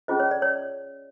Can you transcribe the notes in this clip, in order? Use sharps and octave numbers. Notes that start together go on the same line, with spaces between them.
C#4 F4 G#4 C5 D#5
C#5
D5
C#5